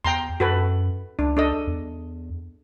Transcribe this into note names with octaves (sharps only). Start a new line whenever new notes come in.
E2 G5 A#5 C6
F#2 F#4 A4 B4
C#2 D4
D4 A4 D#5
E2